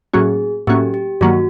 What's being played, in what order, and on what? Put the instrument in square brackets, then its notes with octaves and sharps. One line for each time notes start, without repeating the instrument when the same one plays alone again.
[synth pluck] A2 F#3 A#3 C#4 F#4 [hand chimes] G#4
[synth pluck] A2 F#3 A#3 C#4 F#4 [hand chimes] G4
[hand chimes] G4
[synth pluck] G2 D#3 F#3 A#3 [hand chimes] F#4